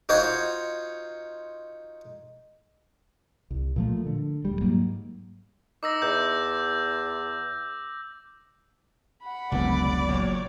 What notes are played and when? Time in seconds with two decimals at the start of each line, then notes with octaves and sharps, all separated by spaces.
0.09 D#4 F4 F#4 C5 C#5 F#5
3.51 C2
3.76 A#2 F3 A3
4.06 D3
4.45 D#1 G3
4.60 G#2 F#3 A#3
5.83 D#4 D6 E6 A#6
6.02 E2 G6
9.23 F#5 B5
9.52 F1 C#2 D3 F#3 B3 D5
10.08 F#1 A#2 F#3 C#5